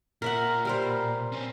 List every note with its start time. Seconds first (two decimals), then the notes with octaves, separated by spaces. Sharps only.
0.22 A#2 A#4 E5 F#5
0.65 G3 A#4 C5
1.32 C4 C#4